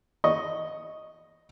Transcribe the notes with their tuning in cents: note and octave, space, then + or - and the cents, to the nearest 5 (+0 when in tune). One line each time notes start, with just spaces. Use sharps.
D#5 +0 C#6 +0